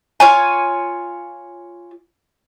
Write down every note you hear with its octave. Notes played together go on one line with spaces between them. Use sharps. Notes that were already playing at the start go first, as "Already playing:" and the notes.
F4 C#5 G#5